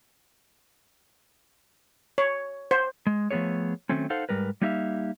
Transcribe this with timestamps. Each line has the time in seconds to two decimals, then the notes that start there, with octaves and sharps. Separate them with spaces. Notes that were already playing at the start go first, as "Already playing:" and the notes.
2.18 C#5
2.71 C5
3.07 G#3
3.31 F3 A3 B3 G#4 C#5
3.89 D#3 F#3 A3 C4 C#4
4.10 D#4 A4 C5 F5 F#5
4.29 G#2 D#3 G3 A#4 B4
4.61 G3 A#3 D#4 G4 E5 F5